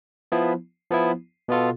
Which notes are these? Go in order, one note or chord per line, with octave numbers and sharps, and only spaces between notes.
F3 B3 E4
F3 B3 E4
B2 B3 F4 A4